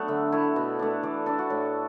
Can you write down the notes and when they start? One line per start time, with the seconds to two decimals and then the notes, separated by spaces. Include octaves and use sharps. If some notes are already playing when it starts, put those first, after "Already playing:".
Already playing: F#3 A3 B3 D4 F#5
0.08 D3 E5
0.32 A3 E4
0.56 B2
0.79 A3 D4
1.03 E3 D5
1.26 D4 A4
1.39 F#4
1.50 A2